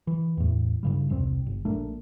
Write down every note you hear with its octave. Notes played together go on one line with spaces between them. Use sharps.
E3
E2 A2
G2 C#3 G3
E1 C2 C#3 C4
G1
A#1 A3 A#3 D4